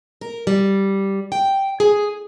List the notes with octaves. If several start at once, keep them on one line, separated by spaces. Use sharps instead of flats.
A#4
G3
G5
G#4